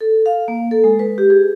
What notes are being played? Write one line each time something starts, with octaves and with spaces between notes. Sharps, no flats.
A4
F5
A#3
A4
G#3
B4
G4
G#4